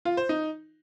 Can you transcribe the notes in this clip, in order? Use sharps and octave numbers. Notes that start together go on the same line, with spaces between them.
F4
C5
D#4